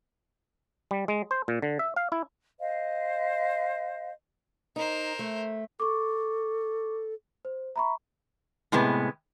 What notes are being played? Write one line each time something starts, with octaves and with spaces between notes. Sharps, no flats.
G3
G#3
C5
A#2
D3
E5
F5
E4
C5 D#5 F5
D#4 A#4 C5
A3
A4 C#6 D6
C5
E5 A#5 B5 C#6
A2 C3 G#3 B3